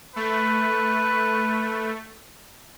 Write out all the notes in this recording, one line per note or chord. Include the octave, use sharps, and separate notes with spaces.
A3 B4